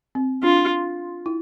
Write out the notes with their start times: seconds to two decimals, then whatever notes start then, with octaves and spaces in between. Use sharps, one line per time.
0.15 C4
0.43 D4 F4
1.26 E4